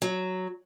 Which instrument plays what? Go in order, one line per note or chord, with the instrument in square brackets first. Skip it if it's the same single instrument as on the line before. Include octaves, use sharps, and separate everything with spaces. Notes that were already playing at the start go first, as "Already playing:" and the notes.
[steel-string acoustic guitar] F#3